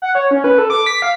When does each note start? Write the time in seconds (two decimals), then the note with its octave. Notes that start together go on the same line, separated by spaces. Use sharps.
0.02 F#5
0.15 C#5
0.31 C#4
0.44 B4
0.58 A4
0.70 D6
0.86 B6
1.02 F5